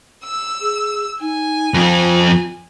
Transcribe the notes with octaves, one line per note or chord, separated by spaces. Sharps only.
E6
G#4
D#4 G#5
F2 C4 F4